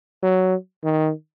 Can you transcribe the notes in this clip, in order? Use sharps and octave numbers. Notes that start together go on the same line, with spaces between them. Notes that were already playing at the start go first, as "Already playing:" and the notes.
F#3
D#3